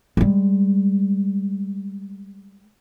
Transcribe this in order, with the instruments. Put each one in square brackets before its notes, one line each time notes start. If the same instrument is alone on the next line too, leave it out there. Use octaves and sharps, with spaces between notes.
[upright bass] G3 G#3